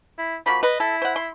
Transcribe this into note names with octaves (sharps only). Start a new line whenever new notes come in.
E4
F3 A#3 F#4 B5
B4 D#5
E4 A4
C5 F#5
C6